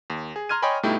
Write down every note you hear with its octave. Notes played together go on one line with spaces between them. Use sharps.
D#2
G#4
A#5 C6 F6 G#6 D#7
C#5 D#5 G5 G#5 B5 C6
G2 B2 A3 D#4 E4 G4